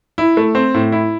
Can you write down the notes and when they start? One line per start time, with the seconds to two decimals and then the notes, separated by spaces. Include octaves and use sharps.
0.18 E4
0.37 A3
0.55 C4
0.74 A2
0.92 E4